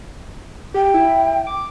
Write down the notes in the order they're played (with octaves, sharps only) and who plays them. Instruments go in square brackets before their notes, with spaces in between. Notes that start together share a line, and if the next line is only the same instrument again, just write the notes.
[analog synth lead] G4 [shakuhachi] G5
[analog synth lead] E4
D6